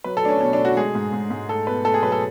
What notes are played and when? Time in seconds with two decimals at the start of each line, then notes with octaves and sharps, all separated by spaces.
0.04 F#3 B4
0.17 A4
0.23 A3 D4
0.29 C#4
0.41 B2 C#4
0.53 D4
0.59 A3
0.65 F#4
0.77 G#3 G#4
0.95 G#2
1.13 G#2
1.30 G#2
1.49 A3 A4
1.67 B2 B4
1.85 A3 A4
1.94 G#4
2.03 F#3 B4
2.12 A4